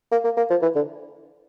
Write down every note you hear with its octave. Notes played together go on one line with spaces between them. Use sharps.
A#3
A#3
A#3
F3
E3
D3